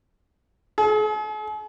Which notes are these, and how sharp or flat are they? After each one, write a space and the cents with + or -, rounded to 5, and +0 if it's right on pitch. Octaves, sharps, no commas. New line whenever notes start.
G#4 +45